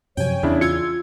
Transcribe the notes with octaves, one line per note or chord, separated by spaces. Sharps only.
F#2 C3 F3 C#5 G5 G#5
E2 C#3 D4 E4
F4 E6 G#6 C#7